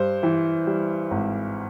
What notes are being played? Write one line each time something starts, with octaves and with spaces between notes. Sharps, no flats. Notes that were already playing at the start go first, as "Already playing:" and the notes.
Already playing: G2 C5
E3
G3
G#1